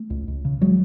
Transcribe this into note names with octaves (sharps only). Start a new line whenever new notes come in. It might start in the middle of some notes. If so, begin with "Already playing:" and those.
Already playing: A3
C#2
C#2
C#3
C#3 F#3 G#3